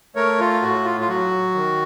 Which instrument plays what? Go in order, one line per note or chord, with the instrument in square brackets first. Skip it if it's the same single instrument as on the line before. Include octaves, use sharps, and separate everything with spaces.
[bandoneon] A3 A#4 C#5
F4
A2 F#4
F4
F4
F#3 F#4
D#3